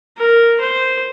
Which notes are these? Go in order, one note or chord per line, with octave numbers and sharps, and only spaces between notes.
A#4
C5